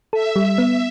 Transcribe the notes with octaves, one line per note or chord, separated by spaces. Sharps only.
A4 E5
G3
B3